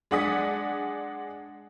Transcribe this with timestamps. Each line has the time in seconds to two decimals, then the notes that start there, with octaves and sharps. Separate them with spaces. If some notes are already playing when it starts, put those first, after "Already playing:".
0.11 G#3 D4 F#5 G#5 D#6 B6